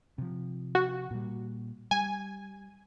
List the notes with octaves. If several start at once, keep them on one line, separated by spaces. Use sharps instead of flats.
C3 F3
F#4
A#2 G3
G3 G#5